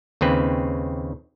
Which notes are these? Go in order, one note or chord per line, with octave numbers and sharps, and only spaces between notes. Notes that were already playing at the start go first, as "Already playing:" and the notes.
D#2 C#3 C4 B4